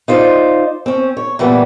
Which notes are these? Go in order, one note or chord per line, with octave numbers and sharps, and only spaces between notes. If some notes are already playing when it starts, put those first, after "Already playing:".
D#4 F4 C5 D5
C4 C#4
C#5
A#2 E3 G3 B3